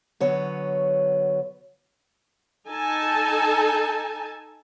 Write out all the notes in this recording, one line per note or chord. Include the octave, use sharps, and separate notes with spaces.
D3 F#3 B3 C#5
D#4 A4 G#5 A5